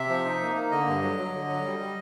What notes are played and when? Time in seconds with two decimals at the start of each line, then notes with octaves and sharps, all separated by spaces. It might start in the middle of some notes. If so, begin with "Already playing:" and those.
Already playing: C3 E5
0.09 F3
0.25 D#4
0.41 A#3
0.55 A#3
0.71 D3 D#5
0.87 G2
1.02 F#3
1.18 F#3
1.34 D3
1.49 F#3
1.64 G3
1.79 G3